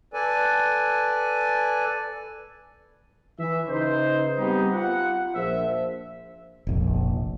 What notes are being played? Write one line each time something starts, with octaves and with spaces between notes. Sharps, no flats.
A4 B4 D5 G#5
E3 E5
C#3 D#4 B4 C5
G3 B3 C4 D#4 G4 G#4
F4 F#5
A#1 F3 C5 E5
F1 A#1